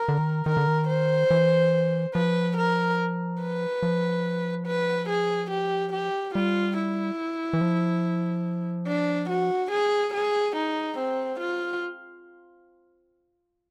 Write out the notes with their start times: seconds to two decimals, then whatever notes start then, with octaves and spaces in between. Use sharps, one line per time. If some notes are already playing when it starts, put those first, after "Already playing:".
Already playing: A#4
0.08 D3
0.18 D#3
0.46 D#3 A#4
0.57 D3
0.67 D#3
0.88 C5
1.31 E3
2.14 F3 B4
2.57 A#4
3.41 B4
3.83 F3
4.66 B4
5.09 G#4
5.51 G4
5.93 G4
6.35 G3 F4
6.77 E4
7.53 E3
7.61 F3
8.87 D4
9.29 F#4
9.71 G#4
10.14 G#4
10.56 D#4
10.98 C4
11.40 F4